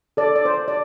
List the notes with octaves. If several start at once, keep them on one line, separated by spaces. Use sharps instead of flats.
A4 D5
D5
C5
D5